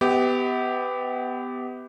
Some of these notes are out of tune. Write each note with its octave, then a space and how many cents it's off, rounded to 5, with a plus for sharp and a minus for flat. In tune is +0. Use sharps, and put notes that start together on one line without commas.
B3 +20 G4 +0 E5 -40